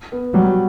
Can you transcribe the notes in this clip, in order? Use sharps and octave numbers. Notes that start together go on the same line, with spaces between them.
B3
F#3 G3